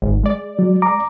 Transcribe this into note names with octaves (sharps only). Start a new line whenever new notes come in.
G#1
G#3 D5
F#3
A#5 D6